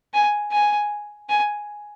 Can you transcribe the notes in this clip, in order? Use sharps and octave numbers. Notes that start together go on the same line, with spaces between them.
G#5
G#5
G#5